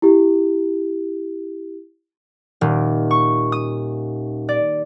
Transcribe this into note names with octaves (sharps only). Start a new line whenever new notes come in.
E4 G4
D#1
C#6
D#6
D5